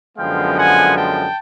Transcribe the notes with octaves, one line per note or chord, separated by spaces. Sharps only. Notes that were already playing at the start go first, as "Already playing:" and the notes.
F#2 D3 F3 G#3 B3 F5 G5
F#5 G#5
G5 A5